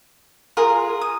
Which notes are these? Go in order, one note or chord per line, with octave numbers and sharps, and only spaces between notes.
F4 G#4 A#4
D#6